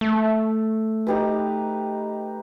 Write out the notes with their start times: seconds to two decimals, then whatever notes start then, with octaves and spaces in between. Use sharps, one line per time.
0.01 A3
1.07 D#4 G4 B4